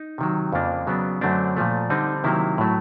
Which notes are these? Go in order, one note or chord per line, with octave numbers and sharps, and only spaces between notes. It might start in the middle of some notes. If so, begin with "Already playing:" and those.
Already playing: D#4
C3 D#3 F#3
F2 C#3 F3 A#3 D4
C#3 F#3 B3 D4
F#2 D3 F#3 A3 C4 D4
A#2 F3 A3
D3 G3 C4 D#4
C3 D#3 F#3 A#3 E4
A2 F#3 A3